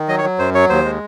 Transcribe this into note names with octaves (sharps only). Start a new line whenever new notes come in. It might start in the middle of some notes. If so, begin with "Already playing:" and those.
Already playing: D#3
F#3 D#5
C#5
F#3
F#2 C5
F#3 C#5
D#2 C5
G#3